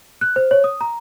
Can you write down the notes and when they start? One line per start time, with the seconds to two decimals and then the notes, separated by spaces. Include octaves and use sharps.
0.21 F#6
0.36 C5
0.51 C#5
0.64 D#6
0.81 A#5